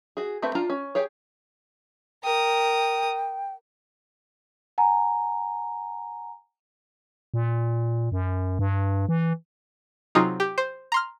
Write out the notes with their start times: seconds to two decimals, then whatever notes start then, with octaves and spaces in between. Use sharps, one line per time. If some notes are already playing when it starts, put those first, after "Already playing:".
0.17 F#4 G#4
0.42 A3 C4 B4 E5
0.55 D4 F4 F5 A5 A#5
0.70 C#4
0.95 G4 G#4 C#5
2.24 A#4 G5 D#6
4.78 F#5 G#5 A#5
7.34 A#2
8.12 F#2
8.59 G2
9.09 E3
10.15 C3 F#3 D#4 F4 G#4
10.40 G4
10.58 C5
10.92 A#5 C6 F6